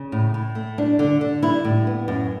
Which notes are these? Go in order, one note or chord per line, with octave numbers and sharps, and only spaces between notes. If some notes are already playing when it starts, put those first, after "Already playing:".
Already playing: C#3
A2
A2
A3
G3 D4
D3
D3
G3 E4
A2
B3
F#2